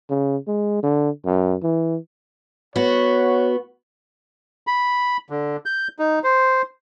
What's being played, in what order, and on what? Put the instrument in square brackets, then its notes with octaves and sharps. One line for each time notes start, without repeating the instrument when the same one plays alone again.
[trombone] C#3
G#3
D3
F#2
E3
[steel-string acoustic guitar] B3 F#4 [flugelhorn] C#5
[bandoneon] B5
D3
G6
D#4
C5